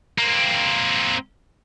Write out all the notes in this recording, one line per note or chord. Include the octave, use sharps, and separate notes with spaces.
A#3 C4